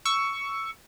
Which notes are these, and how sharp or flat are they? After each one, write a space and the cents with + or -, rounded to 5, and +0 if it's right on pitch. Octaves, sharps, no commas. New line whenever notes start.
C#6 +10 E6 +0